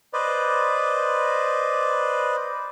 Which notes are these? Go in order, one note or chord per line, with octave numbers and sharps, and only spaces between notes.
B4 C5 D5 D#5